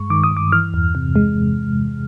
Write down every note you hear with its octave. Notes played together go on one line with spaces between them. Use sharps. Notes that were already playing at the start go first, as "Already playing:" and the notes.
Already playing: G2 G#3 C#6
D#3 D6
D#6
G2
D6
E3 F6
E2
C3
G#3